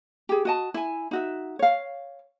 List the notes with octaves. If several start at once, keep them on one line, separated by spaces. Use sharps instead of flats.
G4 G#4
F#4 D#5 A5
E4 G#5
D#4 F#4 E5
C#5 F5